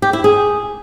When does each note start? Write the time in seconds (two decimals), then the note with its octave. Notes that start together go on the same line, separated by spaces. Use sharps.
0.02 G4
0.13 E4
0.24 G#4